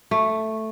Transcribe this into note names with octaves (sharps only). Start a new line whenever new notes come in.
A3